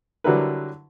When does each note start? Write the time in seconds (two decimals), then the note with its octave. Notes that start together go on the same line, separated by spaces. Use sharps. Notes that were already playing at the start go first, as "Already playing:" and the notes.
0.24 D3 F#3 G3 E4 A#4 B4